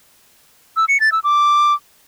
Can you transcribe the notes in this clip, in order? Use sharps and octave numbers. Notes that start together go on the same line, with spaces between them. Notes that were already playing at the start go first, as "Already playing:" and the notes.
E6
C#7
A6
E6
D6